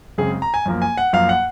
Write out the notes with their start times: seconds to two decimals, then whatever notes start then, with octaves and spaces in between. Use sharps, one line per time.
0.18 F#2 C#3 G#3 C4 G#4
0.42 A#5
0.54 G#5
0.66 F#2 F3 A#3
0.82 G#5
0.97 F#5
1.13 F#2 F3 A#3 F5
1.29 F#5